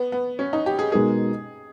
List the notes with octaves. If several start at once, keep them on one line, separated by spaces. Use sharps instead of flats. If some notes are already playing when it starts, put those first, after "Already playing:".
Already playing: B3
B3
C#4
D#4
G4
G#4
B2 G#3 D#4 G#4 A#4